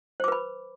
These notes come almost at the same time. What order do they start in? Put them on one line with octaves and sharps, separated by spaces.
C5 D6 B4 B5